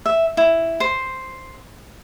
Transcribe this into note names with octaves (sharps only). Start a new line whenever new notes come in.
E5
E4
C5